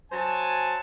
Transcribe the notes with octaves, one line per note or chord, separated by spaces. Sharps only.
F#3 C5 G#5 A5